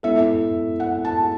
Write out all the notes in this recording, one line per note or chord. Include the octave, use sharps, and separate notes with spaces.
G#3 B3 E4 A4 E5
F#5
A5